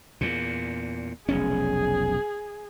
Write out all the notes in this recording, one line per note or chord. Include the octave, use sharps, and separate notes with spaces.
E2 A#2
F1 B1 C#4 G#4